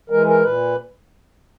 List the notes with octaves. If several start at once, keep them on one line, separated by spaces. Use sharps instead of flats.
E3 G#3 A#4
A#4
A#2 B4